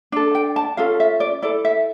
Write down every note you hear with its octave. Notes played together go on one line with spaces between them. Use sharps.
D4 A4
G5
A5
C#4 F4 A4 F5
E5
D5
E4 A4 D5
E5